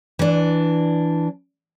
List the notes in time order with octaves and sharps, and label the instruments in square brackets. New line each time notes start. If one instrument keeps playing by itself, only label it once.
[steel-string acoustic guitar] E3 D4